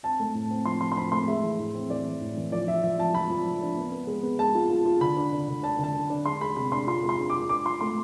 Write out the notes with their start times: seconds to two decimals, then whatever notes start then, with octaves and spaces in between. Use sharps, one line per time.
0.03 C4 A5
0.19 A3
0.35 A2
0.50 C4
0.65 F3 C6
0.81 F3 C6
0.92 C6
0.96 C4 B5
1.12 A3 C6
1.27 G#3 E5
1.43 E3
1.59 A2
1.75 C4
1.90 E3 D5
2.05 E3
2.21 A2
2.37 E3
2.52 F3 D5
2.68 F3 E5
2.84 F3 E5
2.99 F3 A5
3.14 F3 B5
3.30 F3
3.46 F3
3.61 D4
3.77 B3
3.92 B3
4.07 G#3
4.23 B3
4.39 G#3 A5
4.55 F4
4.70 F4
4.85 F4
5.01 D3 B5
5.17 D4
5.32 D3
5.48 D3
5.63 D4 A5
5.79 D3 A5
5.94 D3
6.10 D4
6.25 G#3 C6
6.41 G#3 B5
6.56 C3 B5
6.72 D4 C6
6.87 F4 C6
7.03 G#3
7.09 C6
7.19 D4
7.30 D6
7.35 F4
7.49 D4 D6
7.65 F4 C6
7.81 A3 C6